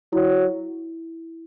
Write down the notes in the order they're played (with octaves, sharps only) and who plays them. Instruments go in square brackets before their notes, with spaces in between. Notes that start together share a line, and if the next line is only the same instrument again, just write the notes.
[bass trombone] F#3 [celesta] E4